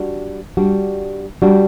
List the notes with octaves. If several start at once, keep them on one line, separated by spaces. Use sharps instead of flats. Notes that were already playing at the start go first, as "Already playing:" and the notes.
Already playing: G3 D4 F#4
G3 D4 F#4
G3 D4 F#4